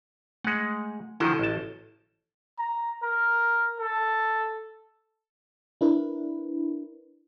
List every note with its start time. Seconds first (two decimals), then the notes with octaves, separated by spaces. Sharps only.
0.44 G#3 A3 F#5
1.20 D3 D#3 F3 E4 F#4 A4
1.39 A1 A5
2.59 A#5
3.03 A#4
3.80 A4
5.81 D4 E4 A#4 B4